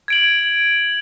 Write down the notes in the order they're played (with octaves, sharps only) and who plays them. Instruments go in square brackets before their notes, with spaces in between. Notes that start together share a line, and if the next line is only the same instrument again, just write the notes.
[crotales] G#6 D7 F#7